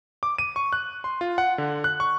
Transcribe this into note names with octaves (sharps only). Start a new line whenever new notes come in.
D6
D#7
C#6
F#6
C6
F4
F#5
D3
F#6
C#6